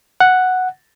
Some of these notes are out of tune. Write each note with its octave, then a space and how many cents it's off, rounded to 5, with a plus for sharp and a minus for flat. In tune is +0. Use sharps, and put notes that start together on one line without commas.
F#5 +0